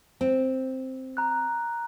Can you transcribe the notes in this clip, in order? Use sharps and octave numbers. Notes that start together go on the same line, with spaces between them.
C4
A#5 F#6